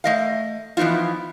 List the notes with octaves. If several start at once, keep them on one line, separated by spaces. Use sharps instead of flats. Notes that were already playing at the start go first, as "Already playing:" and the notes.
A3 D#5 F5
E3 F3 B3 D#4 F4